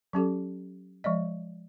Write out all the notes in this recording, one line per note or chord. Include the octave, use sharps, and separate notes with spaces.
F#3 C#4 G4 A4
F3 G#3 D5 D#5